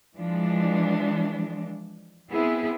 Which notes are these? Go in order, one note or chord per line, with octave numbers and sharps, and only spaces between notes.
E3 F3 G#3 D4
B3 C4 E4 G#4